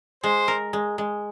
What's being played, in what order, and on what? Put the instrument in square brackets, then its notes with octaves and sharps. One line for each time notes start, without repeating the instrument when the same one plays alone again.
[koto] G#3 [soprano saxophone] C5
[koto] A#4
G#3
G#3